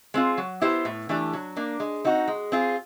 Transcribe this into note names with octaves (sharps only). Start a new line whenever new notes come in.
G#3 C4 F4
F#3
B3 E4 G4 C5
A2
E3 A3 D4 G4
F#3
A#3 D4
G#3
C4 D#4 F#4
G#3
C4 F4 G#4